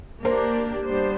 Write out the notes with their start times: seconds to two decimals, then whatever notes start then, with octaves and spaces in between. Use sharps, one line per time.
0.25 A#3 D4 G4 A#4 C5
0.84 G3 B3 D4 G4 C5